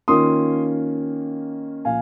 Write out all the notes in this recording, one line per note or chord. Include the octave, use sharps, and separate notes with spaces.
D#3 A#3 C#4 F4 C6 D#6
A#2 F3 F5 G#5